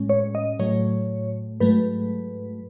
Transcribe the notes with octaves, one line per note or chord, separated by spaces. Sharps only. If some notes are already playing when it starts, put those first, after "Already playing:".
Already playing: A2 G#3 C#4
C#5
D#5
A2 F#3 A3 C#5
G#2 F#3 A3 B4